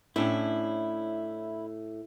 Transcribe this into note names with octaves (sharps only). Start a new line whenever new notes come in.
A2 C#4 D4 E4